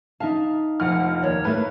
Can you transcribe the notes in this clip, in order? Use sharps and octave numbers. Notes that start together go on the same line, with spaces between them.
D#4 E5 F5 A5
F1 A#1 F#5 F6
D#2 C#5 D5
A2 A3 A#3 B4